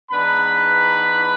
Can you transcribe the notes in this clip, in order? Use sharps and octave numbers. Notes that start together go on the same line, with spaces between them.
G#2 E3 B3 D4 B4 B5